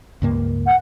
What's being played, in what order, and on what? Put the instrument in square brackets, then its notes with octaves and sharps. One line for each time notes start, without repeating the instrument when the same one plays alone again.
[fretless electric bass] C#2 G2 A#3
[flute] F#5